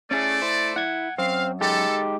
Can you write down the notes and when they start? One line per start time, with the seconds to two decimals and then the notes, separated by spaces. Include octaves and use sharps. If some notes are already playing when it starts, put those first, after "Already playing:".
0.11 A3 C#4 E4 G#4 D5
0.42 E4 C5
0.76 E4 F#5 G#6
1.18 F#2 C4 F5
1.61 G#3 D#4 G4 A4